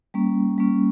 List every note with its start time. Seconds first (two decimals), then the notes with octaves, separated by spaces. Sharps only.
0.14 G3 A#3 C#4
0.58 G3 A#3 C#4